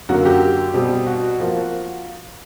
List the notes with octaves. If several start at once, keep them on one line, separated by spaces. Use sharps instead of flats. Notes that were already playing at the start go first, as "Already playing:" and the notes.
F#2 D3 F#3 A#3 F#4
G4
B2 G3 C4
F#4
F3 A#3